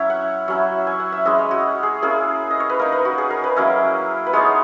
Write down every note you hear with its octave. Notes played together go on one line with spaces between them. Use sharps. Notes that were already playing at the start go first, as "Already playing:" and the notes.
Already playing: F#3 C#4 E4 C#5 E5
F#5
F#3 C#4 E4
G#5
F#5
E5
G#3 C#4 E4 D#5
C#5
F#4
G#4
A#3 C#4 E4 G#4
D#5
C#5
B4
A#3 D#4 A#4
B4
F#4
G#4
A#4
B4
F#3 A#3 C#4 E4
B4
G#3 B3 D#4 C#5